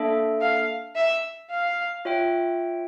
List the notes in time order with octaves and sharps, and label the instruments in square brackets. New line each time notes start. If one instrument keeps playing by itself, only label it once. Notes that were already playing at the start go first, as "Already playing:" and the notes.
Already playing: [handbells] A#3 D4 A4 E5
[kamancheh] F5
E5
F5
[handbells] F4 C#5 E5 G5